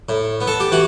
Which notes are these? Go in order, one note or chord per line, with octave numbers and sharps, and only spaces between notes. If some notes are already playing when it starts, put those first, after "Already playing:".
A2
B3
A4
G4
E3 F#4